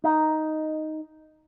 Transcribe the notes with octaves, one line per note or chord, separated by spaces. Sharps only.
D#4